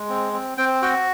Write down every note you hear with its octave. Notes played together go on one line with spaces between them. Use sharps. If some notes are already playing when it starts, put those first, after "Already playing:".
Already playing: G#3
C4
C4
C4 G5
F#4 G5